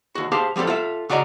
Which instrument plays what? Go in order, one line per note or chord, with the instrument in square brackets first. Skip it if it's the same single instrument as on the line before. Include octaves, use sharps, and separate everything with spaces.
[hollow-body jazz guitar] D#2 F#4
G4 G#4 C5 F5 A5
F3 G3 C4 G4 A4
F4 A4 E5
C#3 F#4 D5 D#5 G5 A#5